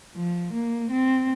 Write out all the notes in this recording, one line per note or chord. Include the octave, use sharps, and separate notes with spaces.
F3
A#3
C4